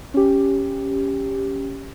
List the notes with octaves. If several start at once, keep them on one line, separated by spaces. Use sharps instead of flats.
C#4 G4